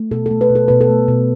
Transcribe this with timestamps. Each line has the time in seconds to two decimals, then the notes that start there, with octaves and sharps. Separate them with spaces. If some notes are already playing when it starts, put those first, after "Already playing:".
Already playing: A3
0.11 B2 A4
0.26 A3 A4
0.41 B4
0.50 B2
0.55 A4
0.68 B2 B4
0.81 A4
0.90 A3
1.08 B2